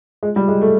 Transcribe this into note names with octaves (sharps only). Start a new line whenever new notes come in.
G#3
G3
G#3
A3